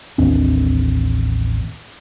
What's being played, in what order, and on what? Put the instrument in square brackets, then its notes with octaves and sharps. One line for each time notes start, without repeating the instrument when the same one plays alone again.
[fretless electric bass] A1 D#2 C4 D4